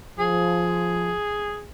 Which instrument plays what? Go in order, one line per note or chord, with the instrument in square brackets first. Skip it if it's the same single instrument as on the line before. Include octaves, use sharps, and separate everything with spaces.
[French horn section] F3 [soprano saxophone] G#4